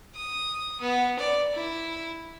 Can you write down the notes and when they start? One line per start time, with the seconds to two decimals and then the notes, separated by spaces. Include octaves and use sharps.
0.16 D#6
0.81 B3
1.19 D5
1.53 E4